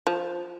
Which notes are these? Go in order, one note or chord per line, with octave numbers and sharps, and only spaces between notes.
F3